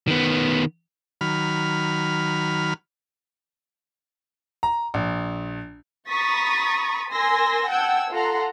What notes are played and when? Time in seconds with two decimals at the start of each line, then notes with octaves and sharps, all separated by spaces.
0.08 D#3 B3
1.21 D#3 F#3 B5 F6
4.63 A#5
4.94 A#1
6.09 A#5 B5 C#6 D#6 A6 B6
7.12 A#4 G#5 C6 E6 A#6
7.69 F#5 G5 A5 E6 G#6
8.12 F4 A4 F#5 A#5 C6